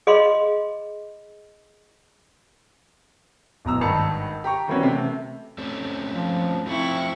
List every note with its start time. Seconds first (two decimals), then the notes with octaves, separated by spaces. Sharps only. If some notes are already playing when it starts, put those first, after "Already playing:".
0.07 G#4 D#5 F5 B5 C6
3.65 D1 B2 A#5 E6
3.81 G#1 G2 D#3 A5 C#7
4.44 G4 A#5 C#6
4.68 E3 G3 A#3 C4 C#4 F#4
4.83 C3 A3
5.58 A3 C4 C#4
6.13 F3
6.67 F3 A3 C4 E4 F4 C#6